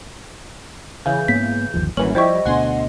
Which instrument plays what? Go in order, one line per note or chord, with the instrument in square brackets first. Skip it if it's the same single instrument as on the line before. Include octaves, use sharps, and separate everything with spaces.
[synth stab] C#3 E3 [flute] G6
[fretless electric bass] G#2 A#3 B3 [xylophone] B6
[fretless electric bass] G1 D#2 F3
[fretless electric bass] G#1 G3 A#3 [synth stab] F#2 E3 C#4 [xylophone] F#7
[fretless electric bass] F3 [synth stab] G3 E4 G4 [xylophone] C5 C#6 [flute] D#5
[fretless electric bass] D2 B2 D3 [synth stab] F#5 G#5 C6